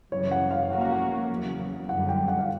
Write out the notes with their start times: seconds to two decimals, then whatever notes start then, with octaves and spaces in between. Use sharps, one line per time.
0.12 F#2 C#3 E3 G3 C#5
0.31 F#5
0.51 F5
0.70 F3 A#3 C#4 F#4 A#4 F#5
0.81 F5
0.92 F#5
1.30 E2 C#3 F#3
1.89 F#2 D3 G3 F#5
2.09 G5
2.28 F#5
2.39 F5